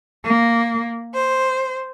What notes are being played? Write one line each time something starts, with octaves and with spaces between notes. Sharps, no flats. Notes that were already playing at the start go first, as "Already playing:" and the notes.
A#3
C5